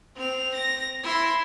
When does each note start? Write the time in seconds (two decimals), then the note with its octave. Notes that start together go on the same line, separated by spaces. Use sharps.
0.16 C4 F7
0.54 A#6
1.03 E4 C6